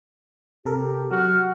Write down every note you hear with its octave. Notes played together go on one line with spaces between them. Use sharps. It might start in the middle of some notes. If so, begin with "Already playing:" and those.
C3 G4 A4 A#4
F#3 F#4 F6